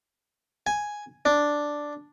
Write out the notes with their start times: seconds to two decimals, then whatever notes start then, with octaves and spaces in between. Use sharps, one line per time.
0.67 G#5
1.25 D4